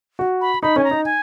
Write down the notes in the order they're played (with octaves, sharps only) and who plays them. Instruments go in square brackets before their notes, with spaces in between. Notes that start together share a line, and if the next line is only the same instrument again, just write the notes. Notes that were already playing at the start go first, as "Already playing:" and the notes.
[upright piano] F#4
[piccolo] B5
[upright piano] D#4 [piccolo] B5
[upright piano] C#4 [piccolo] G#5
[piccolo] A#5
[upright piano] D#4
[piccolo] G#5